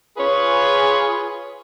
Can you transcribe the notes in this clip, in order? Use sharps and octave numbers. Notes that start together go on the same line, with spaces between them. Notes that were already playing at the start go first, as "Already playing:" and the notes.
F4 G#4 B4 C#5